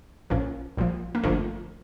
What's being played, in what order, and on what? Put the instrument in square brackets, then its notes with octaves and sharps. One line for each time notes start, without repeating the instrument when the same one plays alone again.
[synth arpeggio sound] A#1 A#2 F3 C#4
A#1 A#2 F3
A#3
G1 F2 D3 F3 A3